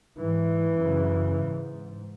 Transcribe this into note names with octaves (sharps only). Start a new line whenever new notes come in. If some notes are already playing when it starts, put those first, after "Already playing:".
G#2 E3
F#2 C#3
G#2